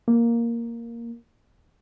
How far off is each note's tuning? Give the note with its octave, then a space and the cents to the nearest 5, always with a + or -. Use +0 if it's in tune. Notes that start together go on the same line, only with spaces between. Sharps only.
A#3 +0